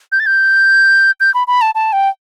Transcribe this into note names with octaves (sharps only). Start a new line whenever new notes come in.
G6
A6
G6
G6
B5
B5
A5
A5
G5